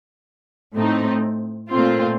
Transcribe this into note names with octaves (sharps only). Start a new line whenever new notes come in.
A2 A3 C4 D#4
A#2 A3 C4 F4